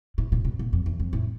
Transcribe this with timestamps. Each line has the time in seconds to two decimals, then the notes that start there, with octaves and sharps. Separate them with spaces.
0.18 A2
0.32 A#2
0.45 B2
0.59 A#2
0.73 F2
0.86 E2
1.00 F2
1.13 A2